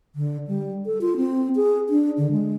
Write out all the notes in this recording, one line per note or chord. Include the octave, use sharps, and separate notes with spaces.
D3
G3
A4
F4
C4
G#4
D4
D3
G#3